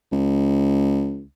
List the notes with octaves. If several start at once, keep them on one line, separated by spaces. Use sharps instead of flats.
C#2